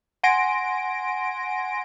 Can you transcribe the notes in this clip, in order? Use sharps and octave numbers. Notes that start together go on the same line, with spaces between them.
F#5 G#5 C6 A#6 D7